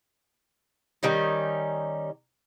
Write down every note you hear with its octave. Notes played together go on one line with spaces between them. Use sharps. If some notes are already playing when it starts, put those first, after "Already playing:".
D#3 G3 C#4 D#4